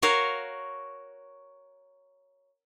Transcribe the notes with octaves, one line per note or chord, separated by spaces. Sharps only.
F#4 A#4 C#5 F5